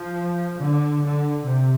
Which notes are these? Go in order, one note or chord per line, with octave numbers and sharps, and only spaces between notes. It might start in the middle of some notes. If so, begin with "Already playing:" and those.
Already playing: F3
D3
D3
C3